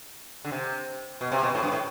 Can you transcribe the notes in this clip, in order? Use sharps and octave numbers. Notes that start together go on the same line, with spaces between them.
D3
C3
B2
C3
B2
A2
G2
A2